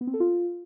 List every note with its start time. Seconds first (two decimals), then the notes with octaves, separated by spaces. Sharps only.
0.01 B3
0.07 C4
0.14 A4
0.20 F4